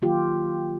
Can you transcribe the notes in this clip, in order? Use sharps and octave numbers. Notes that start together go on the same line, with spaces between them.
D#3 F#3 A#3 F4 G4